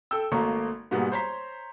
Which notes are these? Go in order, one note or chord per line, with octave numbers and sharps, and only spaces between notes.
A4 G5 E6
G#1 A3 A#3 A#5 C#6
G#2 B2 G3 A#3 B3 G#4
C5 C#5 A#5 C6 B6